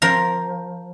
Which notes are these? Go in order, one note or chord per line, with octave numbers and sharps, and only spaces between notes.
F3 A#4 A#5